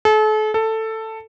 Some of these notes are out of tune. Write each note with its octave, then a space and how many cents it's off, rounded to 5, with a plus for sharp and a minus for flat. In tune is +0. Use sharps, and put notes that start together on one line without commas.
A4 -40
A4 +10